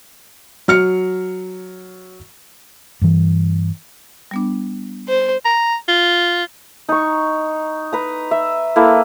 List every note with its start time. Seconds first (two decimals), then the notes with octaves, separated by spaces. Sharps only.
0.68 F#3 F6 C#7
3.02 G2 E3
4.31 G3 B3 D4
5.08 C5
5.45 A#5
5.88 F4
6.89 D#4 C#6
7.93 B4 A#5
8.31 E5
8.76 A#3 E4 A4 B4